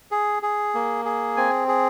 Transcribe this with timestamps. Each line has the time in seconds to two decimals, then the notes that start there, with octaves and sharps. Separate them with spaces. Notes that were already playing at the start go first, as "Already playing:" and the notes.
0.11 G#4
0.43 G#4
0.75 A#3
1.05 G#4
1.37 C4 G#5
1.68 G#4